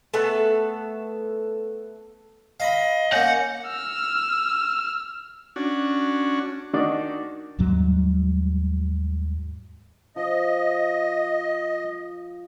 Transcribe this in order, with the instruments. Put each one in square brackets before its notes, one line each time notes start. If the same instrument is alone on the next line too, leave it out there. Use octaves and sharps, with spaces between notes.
[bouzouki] A3 B3 A4 B4
[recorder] D#5 [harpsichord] F5 A#5 B5
[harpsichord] A#3 C#4 [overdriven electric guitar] F#5 [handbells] G6 A#6
[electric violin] E6 F6
[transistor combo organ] C#4 D4 F#4
[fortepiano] D#3 D4 D#4 F#4 D5
[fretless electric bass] D#2 G#2 F#3 G3
[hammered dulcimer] F3 [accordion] D#5